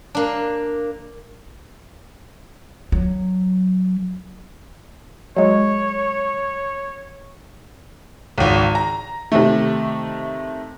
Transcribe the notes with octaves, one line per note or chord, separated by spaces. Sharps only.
A#3 D4
F#3
F#3 G#3 C#5
G#1 C#2
A#5
C3 D#3 A3